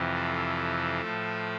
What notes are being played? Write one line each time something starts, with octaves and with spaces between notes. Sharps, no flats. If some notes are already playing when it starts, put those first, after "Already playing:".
Already playing: F2 C3 E3
A4
A2 F3 A3